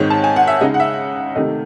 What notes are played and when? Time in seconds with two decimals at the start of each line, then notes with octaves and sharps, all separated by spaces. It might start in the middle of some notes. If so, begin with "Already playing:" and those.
Already playing: G#2 D#3 G#3 C4 C#5
0.10 A5
0.24 G#5
0.36 F#5
0.47 E5
0.61 C#3 G#3 D#4 D#5
0.74 F#5
0.80 E5
1.35 C3 D#3 A3 D#5